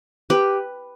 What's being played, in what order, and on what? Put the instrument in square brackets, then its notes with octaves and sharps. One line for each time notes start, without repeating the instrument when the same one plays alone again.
[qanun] G4 B4